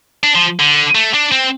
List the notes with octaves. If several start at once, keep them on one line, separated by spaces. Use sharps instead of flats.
D4
F3
D3
A3
D4
C4